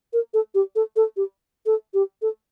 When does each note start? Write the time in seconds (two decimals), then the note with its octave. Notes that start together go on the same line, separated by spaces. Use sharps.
0.13 A#4
0.34 A4
0.55 G4
0.76 A4
0.96 A4
1.17 G4
1.66 A4
1.94 G4
2.22 A4